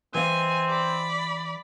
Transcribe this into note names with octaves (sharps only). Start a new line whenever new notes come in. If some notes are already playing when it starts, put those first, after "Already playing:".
E3 C4 D#5 F5 G#5
D5 B5